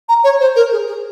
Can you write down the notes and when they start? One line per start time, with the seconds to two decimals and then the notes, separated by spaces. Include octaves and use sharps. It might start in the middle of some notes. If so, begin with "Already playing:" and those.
0.09 A#5
0.24 C#5
0.40 C5
0.56 A#4
0.72 G#4
0.87 G#4